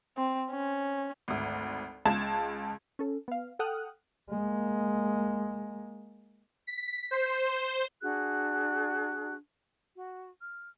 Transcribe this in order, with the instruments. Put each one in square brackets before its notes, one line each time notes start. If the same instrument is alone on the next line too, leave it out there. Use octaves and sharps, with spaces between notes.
[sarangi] C4
C#4
[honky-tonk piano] G#1 D2
C#2 G#3 F5 A5 G#6 E7
[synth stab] C#4 A4
B3 F5
A4 F#5 G5 D#6 F6 F#6
[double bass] G#3 A#3
[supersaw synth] B6
C5
[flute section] D4 F#4 G#4 F#6
F#4
F6